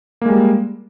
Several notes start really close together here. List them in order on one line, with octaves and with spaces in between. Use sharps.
A#3 G#3 G3